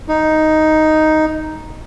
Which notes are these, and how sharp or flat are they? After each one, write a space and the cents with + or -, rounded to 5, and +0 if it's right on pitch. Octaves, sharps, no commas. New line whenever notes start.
D#4 +0